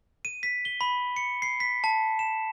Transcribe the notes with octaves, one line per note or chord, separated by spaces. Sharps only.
D#7
B6
G7
B5
C#7
C7
B6
A5
E7